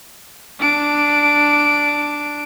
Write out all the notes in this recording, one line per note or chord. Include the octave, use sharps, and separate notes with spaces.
D4 D7